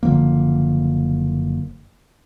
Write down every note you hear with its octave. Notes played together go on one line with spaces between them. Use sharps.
F#1 D3 F3 A#3